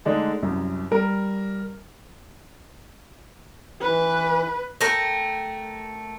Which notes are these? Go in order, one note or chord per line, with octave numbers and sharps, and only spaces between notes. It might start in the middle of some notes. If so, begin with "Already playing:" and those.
D3 G#3 A3 D4 D#4
C2 F#2
G3 A#4
E3 B4
A3 A#4 G5